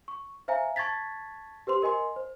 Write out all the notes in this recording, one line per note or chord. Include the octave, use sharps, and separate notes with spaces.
C#6
C5 E5 F5 G#5 A#5
A5 C#6 G#6 A6 B6
G4 B4 C5 C6
A#4 D#5 G#5 C6
C5